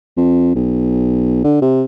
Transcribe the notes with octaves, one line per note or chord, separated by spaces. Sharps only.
F2
B1
D3
C3